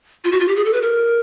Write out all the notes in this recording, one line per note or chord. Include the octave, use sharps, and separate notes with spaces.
F4
F#4
F4
G4
G#4
A4
B4
A#4